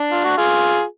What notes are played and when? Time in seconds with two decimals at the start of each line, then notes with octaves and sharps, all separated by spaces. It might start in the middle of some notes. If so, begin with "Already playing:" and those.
Already playing: D4
0.11 F4
0.24 F#4
0.37 F4 G#4